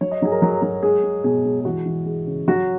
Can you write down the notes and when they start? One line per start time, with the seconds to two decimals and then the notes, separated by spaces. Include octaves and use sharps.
0.01 F#3 C#5
0.11 D#5
0.22 F#3 G#4
0.32 A#4
0.42 F#3 G#4
0.62 F#3
0.83 G#3 G#4
1.03 G#3
1.24 B2 G#4
1.45 G#3
1.60 G#4
1.65 E3 F#4
1.86 E3
2.06 G#3
2.26 C#3
2.48 F#3 F#4